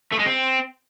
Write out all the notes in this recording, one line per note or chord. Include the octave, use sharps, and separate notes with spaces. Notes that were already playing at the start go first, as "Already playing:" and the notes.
A3
G#3
C4